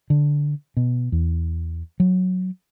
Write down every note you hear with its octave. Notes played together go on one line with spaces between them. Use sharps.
D3
B2
E2
F#3